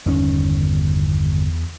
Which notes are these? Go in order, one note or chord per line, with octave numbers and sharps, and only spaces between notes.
G1 E2 D#3 C#4